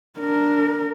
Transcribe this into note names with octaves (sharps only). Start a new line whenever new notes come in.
D4 A#4